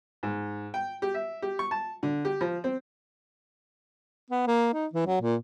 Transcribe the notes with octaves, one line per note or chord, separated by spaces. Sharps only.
G#2
G5
G4
E5
G4
C#6
A5
D3
G4
F3
C4
B3
A#3
D#4
E3
F#3
A#2